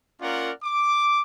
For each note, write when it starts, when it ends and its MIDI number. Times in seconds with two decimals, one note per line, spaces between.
0.22 0.51 58
0.22 0.51 61
0.22 0.51 65
0.22 0.51 70
0.22 0.51 74
0.22 0.51 78
0.64 1.21 86